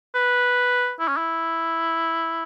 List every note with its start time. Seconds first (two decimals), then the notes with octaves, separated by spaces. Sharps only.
0.15 B4
1.00 E4
1.08 C#4
1.17 E4